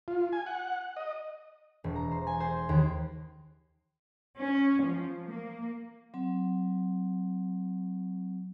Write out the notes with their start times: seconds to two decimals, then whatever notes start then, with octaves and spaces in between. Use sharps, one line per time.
0.08 F4
0.33 G#5
0.46 F#5
0.97 D#5
1.84 E1
1.96 A#5
2.11 C5
2.27 G#5
2.40 C5
2.69 D#2
4.37 C#4
4.83 F3
5.30 A#3
6.14 F#3 C4